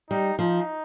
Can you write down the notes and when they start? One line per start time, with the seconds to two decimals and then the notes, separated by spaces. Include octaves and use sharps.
0.10 G3 D#4
0.38 F3 D#4